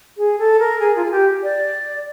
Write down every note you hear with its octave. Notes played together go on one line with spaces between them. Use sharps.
G#4
A4
A#4
G#4
F4
G#4
G4
D5